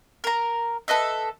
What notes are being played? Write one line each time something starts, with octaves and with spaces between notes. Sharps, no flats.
A#4 A#5
A4 B4 D#5 E5